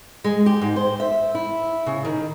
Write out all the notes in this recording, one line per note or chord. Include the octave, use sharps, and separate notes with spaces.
G#3
G4
G#2
C5
E5
E4
C#3
D#3